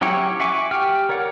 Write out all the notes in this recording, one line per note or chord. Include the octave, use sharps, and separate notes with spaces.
F#3 C#4 E4 G4 C#5
F#4 E5 G#5 C#6 D6
G4 G5 F6
A#4 C#5 D5 F#5